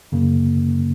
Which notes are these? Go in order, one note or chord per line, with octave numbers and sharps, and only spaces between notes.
F#2 C#3 A#3